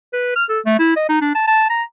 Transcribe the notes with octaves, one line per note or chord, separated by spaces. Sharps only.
B4
F6
A4
A3
E4
D#5
D#4
D4
A5
A5
A#5